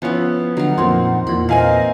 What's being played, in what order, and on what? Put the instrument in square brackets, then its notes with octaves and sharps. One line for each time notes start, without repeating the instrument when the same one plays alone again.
[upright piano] F3 B3 C#4 [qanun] E4 B4
[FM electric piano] D3 F#3 [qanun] D#4 F5 [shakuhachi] F#5
[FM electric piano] F2 A#2 [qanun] D#3 C4 [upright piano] C6
[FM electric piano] E2 A#2 [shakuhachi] E4 [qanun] B5
[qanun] E3 C4 [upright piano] A#3 F5 G#5 [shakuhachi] D#5